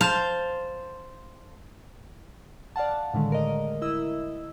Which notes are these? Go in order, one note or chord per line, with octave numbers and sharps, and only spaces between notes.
C5 F5 A5
D5 F5 F#5 A5
A2 D3 D#3 G#3 A3
A#4 D#5
E4 D#5 E6